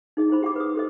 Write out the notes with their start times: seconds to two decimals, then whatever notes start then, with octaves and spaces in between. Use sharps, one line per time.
0.17 D#4 G#4 D#5
0.29 E4 G#4 C5 B5
0.43 G4 F#5 B5 D6
0.56 B4 D#6
0.75 G4 A4 C5 D#5